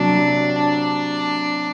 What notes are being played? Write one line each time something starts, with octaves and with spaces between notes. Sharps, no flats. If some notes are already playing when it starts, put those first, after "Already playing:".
Already playing: C3 F#3 A#3 D4
D4